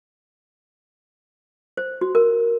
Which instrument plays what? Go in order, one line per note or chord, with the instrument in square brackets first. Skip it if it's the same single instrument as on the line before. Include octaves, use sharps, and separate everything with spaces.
[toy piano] C5
F#4
A#4